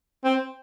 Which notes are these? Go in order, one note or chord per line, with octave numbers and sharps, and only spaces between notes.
C4